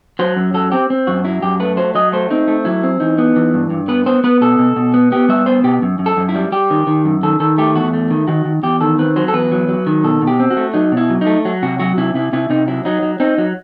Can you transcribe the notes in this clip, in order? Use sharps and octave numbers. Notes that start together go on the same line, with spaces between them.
F#3 C5
F#2
F#3 A4
C4 G4
C4
F#2 F#4
F#3 E4
F#2 G4
A3 B4
F#3 C5
F#3 D#5
A3 C5
C4 D#4
A3
F#3 E4
C4
E3 D#4
B3
E3
G2
G2
B3 B4
B3 C5
B3 B4
B2 A4
B2
B2
B3
B3 G4
G3 E5
B3 C5
B2 G4
F#2
F#2
A4
F#2
E4
G3
G3 G4
D#3
D#3
F#2
D#3 A4
D#3 A4
A3 G4
E2 F#4
A3
D#3
D#3 F#4
D#3
E2 G4
D#3 A4
C4 B4
F#3 C5
A4
E2 B4
F#3
F#3
D#3
B2 A4
B2
G4
C4
F#4
A3
F#3 D#4
B2
E4
F#3
D#4
A3
F#3
C3 F#4
F#3 F#4
C3 E4
C3 E4
C3 E4
C3 D#4
F#3 E4
F#3 D#4
F#3
C4 D#4
F#3